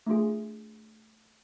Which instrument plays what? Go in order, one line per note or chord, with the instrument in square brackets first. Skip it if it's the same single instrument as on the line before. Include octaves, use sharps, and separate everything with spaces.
[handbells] A3 D4 F4 G#4